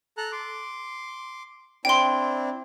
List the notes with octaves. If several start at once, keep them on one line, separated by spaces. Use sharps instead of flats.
A4 A#5 F#6
C6 D6
C4 D4 E4 G5 C6